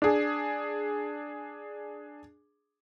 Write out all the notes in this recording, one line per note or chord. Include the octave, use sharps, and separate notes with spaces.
D4 G#4